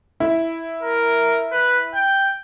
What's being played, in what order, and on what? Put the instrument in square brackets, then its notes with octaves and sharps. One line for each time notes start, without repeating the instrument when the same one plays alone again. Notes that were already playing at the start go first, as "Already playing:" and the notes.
[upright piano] E4
[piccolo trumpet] A#4
B4
G5